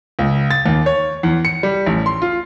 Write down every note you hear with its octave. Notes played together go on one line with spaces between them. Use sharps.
C#2
A6
D#2
C#5
E2
C#7
G3
A1
C6
F4